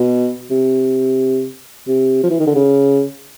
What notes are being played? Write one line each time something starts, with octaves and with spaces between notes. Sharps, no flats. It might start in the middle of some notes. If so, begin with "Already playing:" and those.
Already playing: B2
C3
C3
F3
E3
D#3
D3
C#3